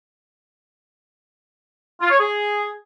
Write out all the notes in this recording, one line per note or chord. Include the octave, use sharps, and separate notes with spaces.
F4
C#5
G#4